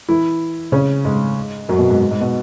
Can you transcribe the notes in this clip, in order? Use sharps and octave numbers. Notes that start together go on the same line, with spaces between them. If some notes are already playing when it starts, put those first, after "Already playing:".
E3 E4
C#3 C#4
G#2 G#3
F#2 F#3
B2
G#2
G#2
G#2
B2